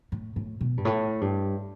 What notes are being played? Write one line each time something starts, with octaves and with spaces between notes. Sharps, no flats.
A2
A2
B2
G2
A2
G2